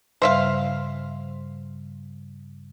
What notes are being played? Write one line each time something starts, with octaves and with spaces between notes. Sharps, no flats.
G2 C#3 G3 C5 E5 F5